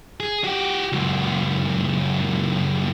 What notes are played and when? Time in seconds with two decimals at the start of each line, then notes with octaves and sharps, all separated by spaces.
0.20 G#4
0.44 F#4 G4
0.92 C#2 F#2